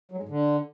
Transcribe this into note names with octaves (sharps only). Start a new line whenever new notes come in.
F#3
G#3
G#2
D3